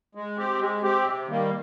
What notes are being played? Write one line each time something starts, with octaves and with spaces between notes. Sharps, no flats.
G#3
C4 G4
G#3
C4 G4
C3
D#3 G3 A#3